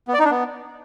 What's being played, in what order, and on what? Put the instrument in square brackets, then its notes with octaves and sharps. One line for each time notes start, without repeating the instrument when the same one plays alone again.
[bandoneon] B3
D5
D#4
D4
B3